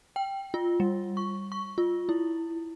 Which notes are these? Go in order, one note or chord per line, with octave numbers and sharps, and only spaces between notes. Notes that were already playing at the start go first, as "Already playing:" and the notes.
G5
F4
G3
C#6
C#6
F4
E4